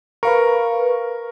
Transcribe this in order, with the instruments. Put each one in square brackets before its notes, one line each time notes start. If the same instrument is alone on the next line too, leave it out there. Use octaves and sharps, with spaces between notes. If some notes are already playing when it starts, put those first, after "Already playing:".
[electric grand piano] A#4 [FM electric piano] B4 F5 C#6